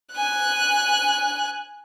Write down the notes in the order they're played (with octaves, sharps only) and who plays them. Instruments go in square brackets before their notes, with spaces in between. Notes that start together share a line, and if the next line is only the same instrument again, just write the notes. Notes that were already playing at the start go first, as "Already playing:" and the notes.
[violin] G#5 F#6